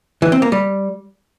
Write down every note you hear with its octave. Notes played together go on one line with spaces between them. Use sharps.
E3
C4
A#3
G3